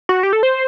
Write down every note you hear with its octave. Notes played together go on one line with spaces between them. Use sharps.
F#4
G4
A4
C5